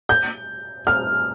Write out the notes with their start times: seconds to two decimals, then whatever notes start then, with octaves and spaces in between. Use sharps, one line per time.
0.09 G6
0.87 F6